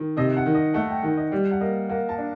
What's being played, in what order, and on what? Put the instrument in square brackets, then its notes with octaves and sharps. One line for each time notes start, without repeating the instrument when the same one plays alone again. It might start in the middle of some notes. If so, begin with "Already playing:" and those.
Already playing: [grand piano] D#3
[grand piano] C3 [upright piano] D#5
[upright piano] F#5
[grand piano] D#3
[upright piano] D#5
[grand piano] A3 [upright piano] F#5
[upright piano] G5
[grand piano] D#3 [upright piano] F#5
[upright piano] D#5
[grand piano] G3 [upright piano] D5
[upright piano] F#5
[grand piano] A#3 [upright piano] D#5
[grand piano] A#3 [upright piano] F#5
[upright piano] A5
[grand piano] D4